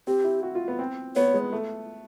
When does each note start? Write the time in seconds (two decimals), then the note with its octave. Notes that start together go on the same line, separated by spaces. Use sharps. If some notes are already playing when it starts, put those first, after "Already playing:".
0.07 C4 G4
0.24 E4
0.43 F#4
0.55 F4
0.68 B3
0.79 C4
1.16 B3 C#5
1.34 G#3
1.52 A3